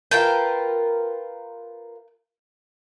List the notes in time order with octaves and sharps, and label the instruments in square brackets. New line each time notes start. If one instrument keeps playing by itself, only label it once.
[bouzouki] F4 A#4 B4 [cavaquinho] G5 A5